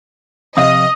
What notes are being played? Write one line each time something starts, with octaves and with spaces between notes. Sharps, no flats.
F2 C3 D#5 F5 D#6